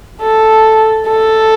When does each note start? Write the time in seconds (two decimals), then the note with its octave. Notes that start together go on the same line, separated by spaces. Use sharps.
0.21 A4
1.08 A4